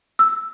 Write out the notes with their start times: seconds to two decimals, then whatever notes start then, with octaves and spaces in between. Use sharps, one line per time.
0.19 E6